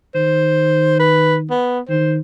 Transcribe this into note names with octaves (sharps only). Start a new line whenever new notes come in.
D#3 C5
B4
B3
D#3 C5